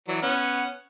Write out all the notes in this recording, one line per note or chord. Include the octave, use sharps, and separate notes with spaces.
E3 F#3 D5
B3 C#4 F#5